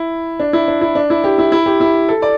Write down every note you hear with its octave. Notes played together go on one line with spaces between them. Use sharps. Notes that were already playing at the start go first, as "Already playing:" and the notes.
Already playing: E4
D4
E4
D4
E4
D4
E4
G4
E4
E4
G4
E4
A4
D5